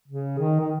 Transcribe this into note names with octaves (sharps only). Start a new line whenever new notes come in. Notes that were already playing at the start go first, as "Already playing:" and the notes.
C#3
D#3
D#3